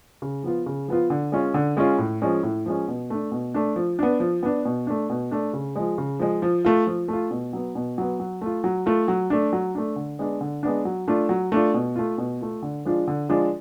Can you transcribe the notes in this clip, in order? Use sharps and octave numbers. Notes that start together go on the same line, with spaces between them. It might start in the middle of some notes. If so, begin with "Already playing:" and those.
C#3
F3 B3 F4
C#3
F3 B3 F4
D3
G#3 C#4 F4
D3
G#3 C#4 F4
A2
F3 G#3 C#4
A2
F3 G#3 C#4
B2
A3 D4
B2
A3 D4
F3
B3 D4
F3
B3 D4
B2
A3 D4
B2
A3 D4
C#3
F3 G#3
C#3
F3 G#3
F3
A3 F4
F3
A3 F4
B2
F#3 B3
B2
F#3 B3
F#3
A3 F4
F#3
A3 F4
F#3
A3 D4
F#3
A3 D4
D3
G#3 B3 D4
D3
G#3 B3 D4
F#3
A3 D4 F4
F#3
A3 D4 F4
B2
A3 F4
B2
A3 F4
D3
F3 G#3 D4 F4
D3
F3 G#3 D4 F4